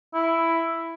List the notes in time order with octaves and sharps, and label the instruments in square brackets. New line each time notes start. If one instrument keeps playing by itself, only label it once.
[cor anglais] E4